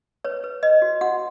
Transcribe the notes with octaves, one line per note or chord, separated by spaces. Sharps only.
B4 C#5
B4
B4 D#5
F#4
F#4 F#5